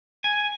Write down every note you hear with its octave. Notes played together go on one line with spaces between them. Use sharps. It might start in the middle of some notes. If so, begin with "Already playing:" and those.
G#5